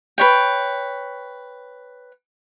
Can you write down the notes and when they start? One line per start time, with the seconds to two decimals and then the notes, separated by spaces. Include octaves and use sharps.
0.18 B4 C#5 G5